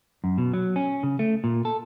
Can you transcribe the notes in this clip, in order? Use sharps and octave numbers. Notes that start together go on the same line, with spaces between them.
F#2
B2
F#3
C#4
C#3
A3
A#2
A4